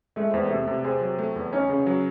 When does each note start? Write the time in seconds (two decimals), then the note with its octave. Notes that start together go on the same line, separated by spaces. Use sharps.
0.16 G#3 A3
0.30 E2 C4
0.45 A3
0.51 C3
0.68 C3
0.84 C4 G#4
1.01 F#3
1.19 A3
1.36 E2
1.52 C#4 D#4
1.70 C#3
1.87 F#3